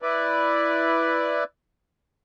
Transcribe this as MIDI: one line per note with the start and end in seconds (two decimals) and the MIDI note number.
0.02 1.44 64
0.02 1.44 71
0.02 1.44 74